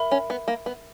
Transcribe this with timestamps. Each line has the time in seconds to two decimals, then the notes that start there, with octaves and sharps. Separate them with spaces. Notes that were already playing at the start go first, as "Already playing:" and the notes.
Already playing: A#4 E5 B5
0.11 C#4
0.30 B3
0.48 A#3
0.66 B3